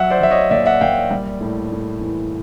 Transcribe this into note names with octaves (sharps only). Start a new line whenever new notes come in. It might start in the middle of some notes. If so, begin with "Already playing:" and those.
Already playing: F#3 E5 F#5
C5 D5
F#3 E5
C#5 D#5
A#2 D5 E5
E5 F#5
A#2 F5 G5
G3
A2
A2
E3